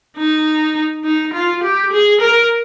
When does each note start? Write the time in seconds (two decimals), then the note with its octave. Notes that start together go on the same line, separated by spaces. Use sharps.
0.17 D#4
1.04 D#4
1.33 F4
1.64 G4
1.92 G#4
2.21 A#4